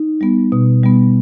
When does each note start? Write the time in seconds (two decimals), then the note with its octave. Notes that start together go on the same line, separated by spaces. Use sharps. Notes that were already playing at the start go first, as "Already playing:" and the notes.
Already playing: D#4
0.21 G3 B3
0.52 B2
0.83 G3 B3